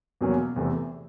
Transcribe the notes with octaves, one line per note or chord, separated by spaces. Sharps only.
E2 B2 F#3 A#3 C#4
E2 C3 E3 A3